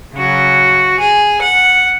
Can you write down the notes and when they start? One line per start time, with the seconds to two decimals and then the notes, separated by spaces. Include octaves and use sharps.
0.16 C#3 F#3 C#4 F#4
1.00 G#4
1.41 F#5